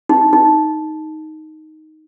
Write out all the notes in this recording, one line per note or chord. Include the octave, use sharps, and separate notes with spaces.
D#4
D#4